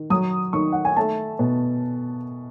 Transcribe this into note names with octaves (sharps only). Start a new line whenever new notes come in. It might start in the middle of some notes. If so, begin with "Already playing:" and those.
Already playing: D#3
F#3 D#6
D#3 C#6
F#5
G#5
A3 A5
B2